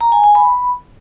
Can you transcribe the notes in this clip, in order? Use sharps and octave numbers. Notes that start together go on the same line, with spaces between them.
A#5
G#5
G#5
B5